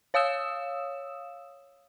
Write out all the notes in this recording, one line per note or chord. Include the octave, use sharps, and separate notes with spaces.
C#5 F5 D#6 E6 E7